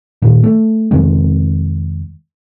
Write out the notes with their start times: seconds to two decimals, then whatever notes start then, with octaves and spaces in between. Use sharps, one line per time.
0.22 A#2 D#3
0.44 A3
0.91 F2 C3 D#3 G#3